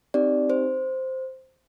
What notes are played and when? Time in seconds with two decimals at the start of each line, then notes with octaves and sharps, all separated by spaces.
0.14 C4 D#4 G4 D5
0.50 C5